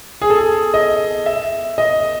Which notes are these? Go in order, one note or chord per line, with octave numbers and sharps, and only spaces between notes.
G#4
A4
G#4
D#5
E5
D#5